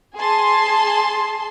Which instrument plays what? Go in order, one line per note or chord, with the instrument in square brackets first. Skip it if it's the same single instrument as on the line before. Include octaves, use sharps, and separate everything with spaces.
[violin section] G#4 A5 C6